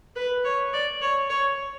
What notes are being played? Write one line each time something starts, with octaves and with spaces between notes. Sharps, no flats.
B4
C#5
D5
C#5
C#5